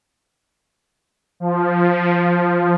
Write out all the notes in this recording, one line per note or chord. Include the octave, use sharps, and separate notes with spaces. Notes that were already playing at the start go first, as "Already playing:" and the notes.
F3